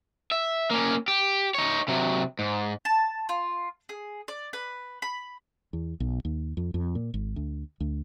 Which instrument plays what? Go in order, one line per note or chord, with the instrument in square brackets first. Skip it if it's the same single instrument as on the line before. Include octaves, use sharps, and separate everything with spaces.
[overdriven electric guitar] E5
A#3 C#4
G4
D#4 C#5
C3 F#3
G#2
[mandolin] A5
F4
G#4
D5
B4
B5
[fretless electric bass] E2
B1
D#2
F2
F2
A#2
G#1
D2
D2